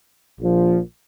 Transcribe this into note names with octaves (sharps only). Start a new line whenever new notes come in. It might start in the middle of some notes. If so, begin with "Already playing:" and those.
A#1 A#2 F3